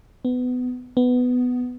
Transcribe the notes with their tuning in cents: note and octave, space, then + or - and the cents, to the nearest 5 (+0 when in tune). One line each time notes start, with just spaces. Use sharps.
B3 +20
B3 +10